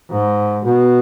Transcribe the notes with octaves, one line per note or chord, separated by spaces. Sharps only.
G#2
B2